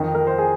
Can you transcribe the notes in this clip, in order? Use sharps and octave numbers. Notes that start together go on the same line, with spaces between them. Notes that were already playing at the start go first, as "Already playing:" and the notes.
Already playing: F2 D#3
A#4
C5
G#4